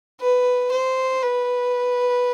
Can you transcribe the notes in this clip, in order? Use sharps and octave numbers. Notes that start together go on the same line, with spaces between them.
B4
C5
B4